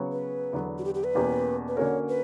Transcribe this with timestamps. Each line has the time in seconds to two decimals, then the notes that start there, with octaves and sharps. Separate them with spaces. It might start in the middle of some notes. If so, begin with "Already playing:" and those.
Already playing: C#3 F#3 B3 F#4 C#5
0.12 B4
0.53 E2 D3 F#3 B3 D4
0.78 F#4
0.84 G4
0.95 G4
1.05 B4
1.15 E2 B2 A#3 C#4 G4
1.68 B4
1.77 D3 A#3 C#4 F#4 A#4 C#5
2.08 B4